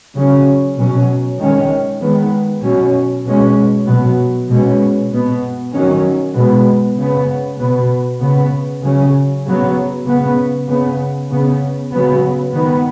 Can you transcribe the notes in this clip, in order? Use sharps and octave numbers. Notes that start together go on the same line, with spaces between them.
C#3 F#3 C#4
B2 F#3 C#4
D#3 G#3 C#4
D#3 G#3 B3
B2 F#3 C#4
B2 G#3 C#4
B2 F#3 B3
B2 G#3 C#4
B2 B3
D#3 F#3 C#4
B2 G#3 B3
C#3 B3
B2 B3
C#3 B3
C#3 F#3 C#4
C#3 F#3 B3
C#3 B3
C#3 B3
C#3 B3
C#3 F#3 B3
D#3 B3